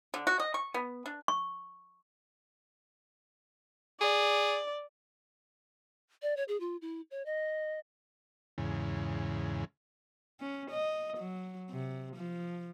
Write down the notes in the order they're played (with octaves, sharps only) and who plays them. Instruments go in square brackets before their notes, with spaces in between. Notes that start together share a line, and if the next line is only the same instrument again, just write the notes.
[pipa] D3
F#4
D#5
C#6
B3
D4
[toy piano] C#6
[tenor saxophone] G#4 [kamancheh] D5
[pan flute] D5
C#5
G#4
F4
E4
C#5
D#5
[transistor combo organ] E2 G#2 C#3
[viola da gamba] C#4
D#5
F#3
C3
F3